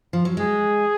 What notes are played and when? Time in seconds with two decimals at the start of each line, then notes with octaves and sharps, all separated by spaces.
0.13 F3
0.25 F#3
0.37 G#3 G#4